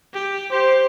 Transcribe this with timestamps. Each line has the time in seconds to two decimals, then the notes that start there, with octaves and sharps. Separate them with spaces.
0.13 G4
0.51 G4 C5